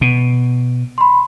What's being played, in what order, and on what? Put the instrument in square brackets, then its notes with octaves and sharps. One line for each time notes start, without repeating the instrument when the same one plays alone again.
[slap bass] B2
[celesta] B5 C6